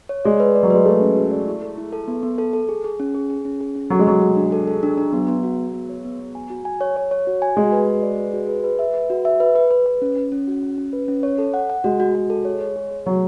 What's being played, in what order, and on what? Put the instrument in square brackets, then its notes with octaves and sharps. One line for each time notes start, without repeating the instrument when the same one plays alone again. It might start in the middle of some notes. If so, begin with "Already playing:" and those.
[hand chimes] C#5
[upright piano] G#3 [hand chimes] D5
[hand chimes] B4
D5
[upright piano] F#3
[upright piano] G#3 [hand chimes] B4
[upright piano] A3 [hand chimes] B4
[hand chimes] C#4
F#4
D5
E4
A4
E4
A4
B3
B3
A4
A4
G#4
G#4
C#4
G#4
G#4
C#4
G#4
C#4
[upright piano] F#3 [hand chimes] A4
[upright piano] G#3
[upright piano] F#3 [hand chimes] A4
[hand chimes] F#4
D4
A4
A4
D4
D4
[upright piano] F#3 [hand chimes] B3
[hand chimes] B3
F#4
F#4
B3
C#5
B3
B3
G#5
F#4
G#5
C#5
C#5
C#5
F#4
G#5
[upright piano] G#3 [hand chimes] F#4
[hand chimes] B4
F#4
D5
B4
F#4
B4
B4
E5
B4
F#4
E5
B4
B4
B4
B4
C#4
C#4
C#4
F#4
C#4
C#4
B4
C#4
C#5
A4
F#5
F#5
[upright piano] G#3 [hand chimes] F#4
[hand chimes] F#4
F#4
A4
C#5
C#5
G#4
G#4
[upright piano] F#3 [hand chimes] C#5